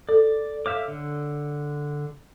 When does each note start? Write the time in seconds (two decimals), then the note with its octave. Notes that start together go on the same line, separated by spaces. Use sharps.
0.09 A4 D5
0.66 C#5 E5 F5 D6
0.88 D3